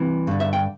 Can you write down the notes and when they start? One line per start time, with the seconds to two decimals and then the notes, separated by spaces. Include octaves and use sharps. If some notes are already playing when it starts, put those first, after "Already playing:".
Already playing: C2 C3 E3
0.27 G2 D3
0.40 E5
0.53 G5